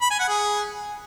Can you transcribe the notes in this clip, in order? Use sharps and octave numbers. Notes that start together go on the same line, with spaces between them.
B5
G#5
F#5
G#4